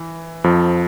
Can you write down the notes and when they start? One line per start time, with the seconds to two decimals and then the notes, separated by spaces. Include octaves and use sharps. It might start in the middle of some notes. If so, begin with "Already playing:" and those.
Already playing: E3
0.44 F2 F3